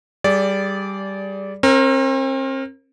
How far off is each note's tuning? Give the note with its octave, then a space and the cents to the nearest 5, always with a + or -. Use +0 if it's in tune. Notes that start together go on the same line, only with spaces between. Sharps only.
G3 +0 G#4 +15 D5 -15
C4 +40 A#4 +0